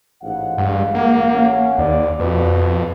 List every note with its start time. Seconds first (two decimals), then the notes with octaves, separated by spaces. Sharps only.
0.23 A1 G#2 F5 F#5
0.58 G2 G#3
0.95 A#3
1.34 C#4
1.78 D#2 D5
2.20 F2 B2 B4